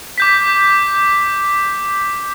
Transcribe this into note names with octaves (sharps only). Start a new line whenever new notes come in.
D6 G6 B6